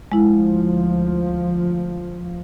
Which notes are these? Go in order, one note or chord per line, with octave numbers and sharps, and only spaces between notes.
D2 F3 G#3 E4